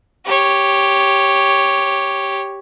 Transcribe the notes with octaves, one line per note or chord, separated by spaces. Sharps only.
G4 C#5